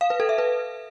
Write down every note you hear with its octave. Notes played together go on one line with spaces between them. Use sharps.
F5
B4
A4
E5
B4